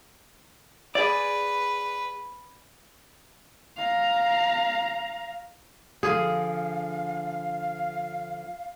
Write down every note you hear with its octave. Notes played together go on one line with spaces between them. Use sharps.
G#4 B4 D5
F5 A#5
D3 F3 G#4 F5